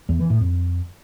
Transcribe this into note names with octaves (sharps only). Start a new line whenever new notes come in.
E2
E3
A2
F2